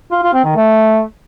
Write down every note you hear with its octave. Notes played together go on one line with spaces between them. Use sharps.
F4
F4
C4
D#3
A3